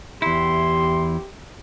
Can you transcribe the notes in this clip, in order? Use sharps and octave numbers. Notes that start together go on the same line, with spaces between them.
E2 E4 G4 C6